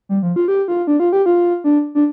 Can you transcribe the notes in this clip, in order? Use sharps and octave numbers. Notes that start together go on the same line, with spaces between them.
G3
F3
F4
G4
F4
D4
F4
G4
F4
D4
D4